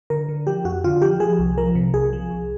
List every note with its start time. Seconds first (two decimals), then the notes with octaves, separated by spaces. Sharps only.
0.10 D3 A#4
0.29 D3
0.47 F3 G4
0.65 F2 F#4
0.84 D3 F4
1.02 F3 G4
1.20 F3 G#4
1.39 C2
1.58 F3 A#4
1.75 C3
1.94 C2 G#4
2.13 F3
2.30 C2